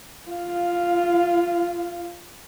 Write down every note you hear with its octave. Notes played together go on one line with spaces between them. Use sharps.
F4 F5